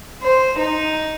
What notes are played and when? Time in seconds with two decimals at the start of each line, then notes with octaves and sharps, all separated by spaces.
0.22 C5
0.58 D#4